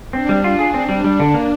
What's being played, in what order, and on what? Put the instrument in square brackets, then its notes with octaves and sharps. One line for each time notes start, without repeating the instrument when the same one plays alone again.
[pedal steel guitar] C4 [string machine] D4
[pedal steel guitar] G3
F4
G#4
C4
G3
[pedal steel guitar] G3 [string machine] D4
[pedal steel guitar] D3
A#3